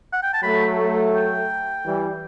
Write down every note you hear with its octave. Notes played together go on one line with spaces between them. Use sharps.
F#5
G5
A5
F#3 A3 B5
G5
E3 G3